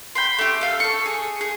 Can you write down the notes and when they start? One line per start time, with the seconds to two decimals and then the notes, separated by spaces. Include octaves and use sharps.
0.15 G5 B5 C6
0.39 A3 G4
0.61 A4 F5
0.80 A4 C#6
1.06 G#4
1.41 G#4